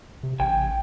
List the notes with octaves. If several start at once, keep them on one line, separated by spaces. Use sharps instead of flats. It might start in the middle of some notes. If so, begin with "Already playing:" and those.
C3
A1 G5 G#5